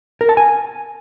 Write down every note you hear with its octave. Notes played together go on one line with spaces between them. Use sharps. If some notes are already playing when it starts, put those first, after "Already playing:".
A#4
A5
G#5